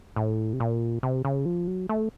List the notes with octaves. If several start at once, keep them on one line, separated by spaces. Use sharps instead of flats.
A2
C3
A#2
C3
C#3
F3
F#3
A3